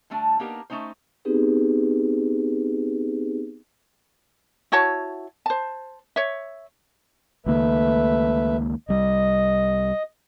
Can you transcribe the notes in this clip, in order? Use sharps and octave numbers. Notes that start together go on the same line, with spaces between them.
D3 G3 A3 D4
A#3 B3 D4 D#4 G4 A#4
A3 C#4 D#4 C5
B3 C4 D#4 G4 G#4 B4
E4 F#4 C#5 A5
C5 A5
C#5 E5
C#2 D#3 A3 A#3 B4 E5
C2 G3 D#5